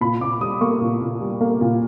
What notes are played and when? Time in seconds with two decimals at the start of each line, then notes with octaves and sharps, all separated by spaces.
0.01 A#2 B5
0.21 A#2 D6
0.41 G3 D#6
0.61 A#3 C#6
0.81 A#2
1.01 A#2
1.21 G3
1.41 A#3
1.61 A#2